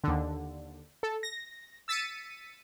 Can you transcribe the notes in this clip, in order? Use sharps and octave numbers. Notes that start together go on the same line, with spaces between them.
D#2 D3
A4
A#6
E6 A6 B6 C#7 D#7